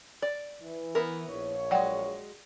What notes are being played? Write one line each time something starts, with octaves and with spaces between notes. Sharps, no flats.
D5
E3
B3 E4 A#4
A#1 C#5
F#3 G#3 D5 F#5 G5